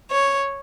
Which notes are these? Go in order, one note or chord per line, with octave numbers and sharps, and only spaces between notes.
C#5